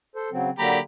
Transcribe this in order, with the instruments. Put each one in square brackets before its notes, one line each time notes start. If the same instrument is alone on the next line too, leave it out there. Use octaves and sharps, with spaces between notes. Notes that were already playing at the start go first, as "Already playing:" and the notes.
[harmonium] A4 C5
C#3 F#3 C4
[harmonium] D3 F#3 A#3 [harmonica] G4 A#5 B5